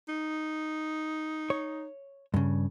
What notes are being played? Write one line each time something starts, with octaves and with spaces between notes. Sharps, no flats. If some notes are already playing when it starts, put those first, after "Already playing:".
D#4
C#5
G2 C#3